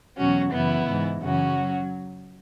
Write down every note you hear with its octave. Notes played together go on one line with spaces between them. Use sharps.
E2 B2 F#3 C#4 F#4
F#2 C#3 E3 B3 E4
G#2 E3
F#2 C#3 E3 C#4 F#4
F#3